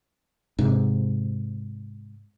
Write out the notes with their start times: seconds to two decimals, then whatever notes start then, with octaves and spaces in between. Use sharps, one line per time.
0.59 G#2 C3